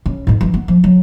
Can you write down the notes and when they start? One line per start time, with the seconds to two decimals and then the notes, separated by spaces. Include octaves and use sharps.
0.06 C#3
0.27 F2 G#2
0.41 E3 F#3
0.54 B3
0.68 F3
0.84 F#3